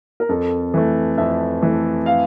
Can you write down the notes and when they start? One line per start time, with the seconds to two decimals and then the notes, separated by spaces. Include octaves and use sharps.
0.20 A#4
0.29 F2 A4
0.74 E3 A3
1.18 F2 E5
1.62 E3 A3
2.06 F5